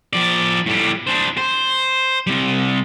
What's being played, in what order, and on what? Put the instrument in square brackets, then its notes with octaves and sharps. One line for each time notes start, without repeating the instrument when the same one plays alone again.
[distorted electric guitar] F3 D5
A2 G3
D4 C5
C5
C3 G3